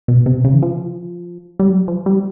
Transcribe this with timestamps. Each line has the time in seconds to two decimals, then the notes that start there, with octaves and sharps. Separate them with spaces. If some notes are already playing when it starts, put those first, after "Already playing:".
0.08 B2
0.26 C3
0.44 C#3
0.54 E3
0.62 F3
1.59 G3
1.70 F#3
1.88 F3
2.06 G3